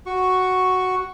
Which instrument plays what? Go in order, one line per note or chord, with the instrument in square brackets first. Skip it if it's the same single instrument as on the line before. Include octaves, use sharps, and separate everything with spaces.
[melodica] F#4 C#6